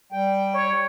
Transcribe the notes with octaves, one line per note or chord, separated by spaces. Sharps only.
G3 G5
C#5